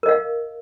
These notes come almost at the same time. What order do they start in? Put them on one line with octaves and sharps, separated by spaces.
A#4 D#5 F5